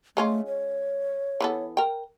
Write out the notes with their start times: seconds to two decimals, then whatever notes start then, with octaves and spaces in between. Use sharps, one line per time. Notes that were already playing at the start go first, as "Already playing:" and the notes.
0.17 G#3 A3 C#4 F4
0.47 C#5
1.40 E3 B3 A4
1.77 A#4 G5